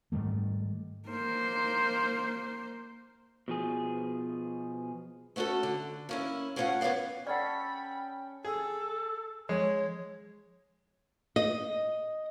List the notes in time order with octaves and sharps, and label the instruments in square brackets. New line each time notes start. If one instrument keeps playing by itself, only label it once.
[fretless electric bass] G#2 D#3 G3 A3
[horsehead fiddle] A#3 C5
[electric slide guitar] B2 F3 G#4
[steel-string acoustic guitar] A3 B3 C#4 F#4 A4
D3
A#3 C#4 E4
A2 C#4 F4 A#4 F5 F#5
E2 B3 C#5 D5 F5
[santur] C#4 A4 [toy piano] D5 F#5 [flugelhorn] G5 [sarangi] B5
[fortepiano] G#4 [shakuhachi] A4
[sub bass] F3 [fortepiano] G#3 [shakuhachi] C#5
[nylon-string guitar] D#5